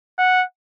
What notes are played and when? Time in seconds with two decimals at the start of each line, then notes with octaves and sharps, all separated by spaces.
0.19 F#5